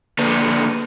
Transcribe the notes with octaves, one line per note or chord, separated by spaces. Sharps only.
D3 A#3 D4 B4